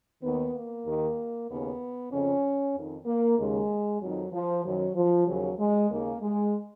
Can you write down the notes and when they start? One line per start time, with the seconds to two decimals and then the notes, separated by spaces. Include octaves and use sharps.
0.23 D#2 D#3 B3
0.54 A#3
0.85 D#2 D#3
1.49 D#2 C#3 B3
2.11 F2 C#3 C#4
2.75 F2 D#3
3.06 A#3
3.38 D#2 C#3 G#3
4.01 F2 D#3 F#3
4.33 F3
4.64 F#2 D#3 F#3
4.96 F3
5.27 D#2 C#3 F#3
5.59 G#3
5.90 D#2 C#3 A#3
6.22 G#3